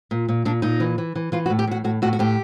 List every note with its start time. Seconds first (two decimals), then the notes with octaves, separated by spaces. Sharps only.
0.11 A#2
0.29 A#2
0.45 A#2 D4
0.62 A#2 D#4
0.80 E3
0.98 E3
1.15 E3
1.32 E3 F4
1.46 F#4
1.50 A2
1.59 G4
1.67 A2 F#4
1.84 A2 F#4
2.02 A2 F#4
2.13 F#4
2.19 A2 G4